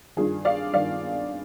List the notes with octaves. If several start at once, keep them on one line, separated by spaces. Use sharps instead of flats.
G2 D#3 F4 G#4
D5 F5
G2 D#3 D5 F5